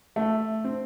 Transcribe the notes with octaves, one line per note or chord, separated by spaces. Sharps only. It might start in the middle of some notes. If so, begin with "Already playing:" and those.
A3
C4